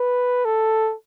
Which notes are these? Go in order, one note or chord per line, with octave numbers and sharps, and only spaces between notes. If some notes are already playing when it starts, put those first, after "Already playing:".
Already playing: B4
A4